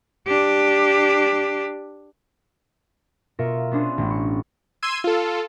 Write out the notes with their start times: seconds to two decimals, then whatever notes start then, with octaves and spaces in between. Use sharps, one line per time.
0.27 D4 G4
3.39 B2 F4 A#4 E5 C#7
3.71 B3 C#4 D4 G#4 C5
3.98 A1 A2
4.10 C#6
4.82 C6 E6 G#6 D#7
5.04 F4 A4